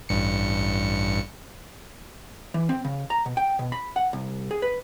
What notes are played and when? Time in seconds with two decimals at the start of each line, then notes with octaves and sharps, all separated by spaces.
0.09 A1 G2 C#7
2.54 E3
2.69 C4
2.85 C#3
3.10 A#5
3.26 B2
3.37 G5
3.59 B2
3.72 B5
3.96 F#5
4.13 C2
4.51 G#4
4.62 B4